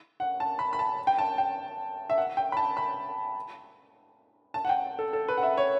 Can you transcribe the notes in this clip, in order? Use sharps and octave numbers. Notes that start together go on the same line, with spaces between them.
F#5
A5
B5
B5
A5
G5
A5
G5
E5
F#5
G5
B5
A5
B5
A5
F#5
G5
A4
A4
B4
F#5
E5
C#5